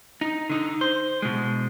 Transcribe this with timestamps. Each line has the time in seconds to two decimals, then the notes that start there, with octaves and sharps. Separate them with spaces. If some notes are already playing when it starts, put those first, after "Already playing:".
0.21 D#4
0.50 D3 D#4
0.81 C5
1.22 B2 G#3